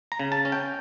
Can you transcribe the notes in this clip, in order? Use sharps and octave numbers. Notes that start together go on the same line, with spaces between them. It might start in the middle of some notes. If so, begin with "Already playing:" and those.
A#5
C#3
A5
C#4
G5